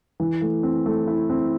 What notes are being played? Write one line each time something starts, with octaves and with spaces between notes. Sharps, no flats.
E3
A3
C4
A3
E4
C4